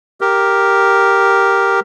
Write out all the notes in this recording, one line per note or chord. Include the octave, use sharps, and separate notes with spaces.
G4 A#4